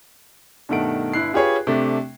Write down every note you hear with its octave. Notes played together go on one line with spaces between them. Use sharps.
G2 B2 D#3 A3 F#5 D7
G1 E4 F#6 C7
F4 G4 G#4 B4 C#5
C3 A3 D4